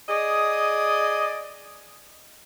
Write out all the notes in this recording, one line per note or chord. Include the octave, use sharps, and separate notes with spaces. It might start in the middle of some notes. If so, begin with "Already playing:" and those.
G#4 D5 D#5